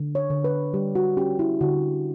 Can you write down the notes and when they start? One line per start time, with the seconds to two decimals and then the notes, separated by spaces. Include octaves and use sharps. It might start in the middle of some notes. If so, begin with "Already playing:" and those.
Already playing: D3
0.15 C#5
0.30 D3
0.44 B4
0.74 G3 G4
0.95 F#4
1.17 C#4 G4
1.39 E4
1.61 D3 F#4